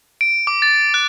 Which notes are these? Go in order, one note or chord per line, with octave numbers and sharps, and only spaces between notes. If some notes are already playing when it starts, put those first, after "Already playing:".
D7
D6
A6
F#6